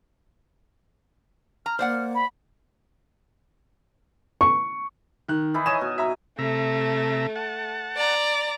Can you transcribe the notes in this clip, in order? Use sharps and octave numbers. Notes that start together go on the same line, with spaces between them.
A#5 F6
A#3 C5 D5 F#5
B5
C#6
D#3 F#6
E3 D#4 E4
C#5 D#5 G#5 E7
B2
E5 A#5
C3 A3 E5 A#5
F#5 A5
D5 A#5